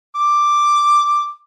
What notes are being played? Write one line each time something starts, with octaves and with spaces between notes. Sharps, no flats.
D6